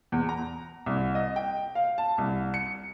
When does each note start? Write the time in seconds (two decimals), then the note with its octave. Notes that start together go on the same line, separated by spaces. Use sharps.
0.12 E2
0.29 A#5
0.86 C2
1.15 D#5
1.36 G5
1.75 F5
1.98 A5
2.18 C2
2.54 C#7